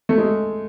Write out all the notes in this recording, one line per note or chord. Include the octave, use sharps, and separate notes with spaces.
A3
G#3